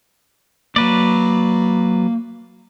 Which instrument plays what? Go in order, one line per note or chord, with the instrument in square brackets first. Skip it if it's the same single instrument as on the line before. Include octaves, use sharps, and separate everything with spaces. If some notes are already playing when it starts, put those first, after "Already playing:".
[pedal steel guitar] F#3 B4 D5 [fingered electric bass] A#3